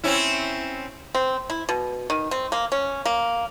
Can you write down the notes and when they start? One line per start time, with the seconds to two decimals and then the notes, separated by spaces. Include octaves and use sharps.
0.04 C4 C#4 E4
1.15 C4
1.50 E4
1.69 B2
2.10 D#3
2.31 C4
2.52 A#3
2.72 C#4
3.05 A#3